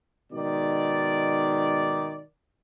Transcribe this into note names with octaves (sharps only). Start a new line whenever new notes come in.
G#2 B2 D#3 D5